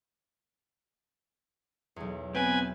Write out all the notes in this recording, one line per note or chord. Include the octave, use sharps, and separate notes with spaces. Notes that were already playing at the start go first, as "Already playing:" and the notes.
B1 E2
B3 C4 B4 G#5